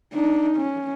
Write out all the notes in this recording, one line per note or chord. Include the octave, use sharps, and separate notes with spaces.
D4 D#4
C#4